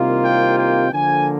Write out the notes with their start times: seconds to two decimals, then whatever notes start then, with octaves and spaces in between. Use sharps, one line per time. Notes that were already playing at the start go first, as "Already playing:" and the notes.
Already playing: C2 C3 D#3 A#3 F4
0.22 G5
0.57 G5
0.92 D3 F3 A#3 G#5